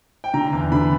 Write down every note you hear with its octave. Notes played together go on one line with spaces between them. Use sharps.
G5
D3 A#5
E2
D3 B5